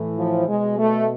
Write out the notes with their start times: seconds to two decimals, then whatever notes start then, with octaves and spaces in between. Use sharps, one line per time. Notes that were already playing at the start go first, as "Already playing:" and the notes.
Already playing: A2 E3
0.18 F3
0.48 B2 G#3
0.78 A3